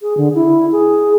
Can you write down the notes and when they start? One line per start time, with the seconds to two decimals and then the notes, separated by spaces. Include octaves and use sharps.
0.01 G#4
0.17 D3
0.34 E4
0.71 G#4